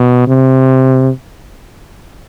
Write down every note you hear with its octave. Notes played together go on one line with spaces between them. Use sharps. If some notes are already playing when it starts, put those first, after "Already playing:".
Already playing: B2
C3